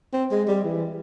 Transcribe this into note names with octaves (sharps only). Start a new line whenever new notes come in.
C4
G#3
G3
E3